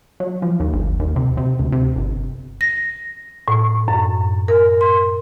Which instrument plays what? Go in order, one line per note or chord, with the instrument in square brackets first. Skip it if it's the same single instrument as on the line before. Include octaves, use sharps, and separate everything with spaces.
[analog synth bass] F#3
F3
D#2
G1
D#2
C3
C3
D2
C3
G1
[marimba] A#6
A2
F#2
A#4
C6